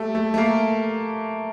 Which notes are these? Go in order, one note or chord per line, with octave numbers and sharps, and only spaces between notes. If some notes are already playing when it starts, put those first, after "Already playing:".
Already playing: G3 A3
A3
A3
A#3